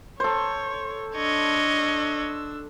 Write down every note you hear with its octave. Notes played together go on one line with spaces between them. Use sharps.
A4 C5 C#5
D4 C#5 D#5 E6